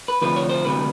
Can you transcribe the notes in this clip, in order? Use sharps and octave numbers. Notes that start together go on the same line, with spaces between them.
B4
D2 C3 F3 B4
C#5
C5
D2 C3 F#3 B4